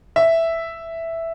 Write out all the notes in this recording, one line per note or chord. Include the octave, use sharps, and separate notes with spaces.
E5